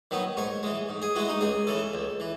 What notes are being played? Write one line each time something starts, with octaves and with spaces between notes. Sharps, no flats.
D#3 F#3 B3
G#2 C#5
E3 G#3
G#2
G#4
E3 G#3 F#4
D#4
C#2 G#4
C#3 E3 A4
C#2
E3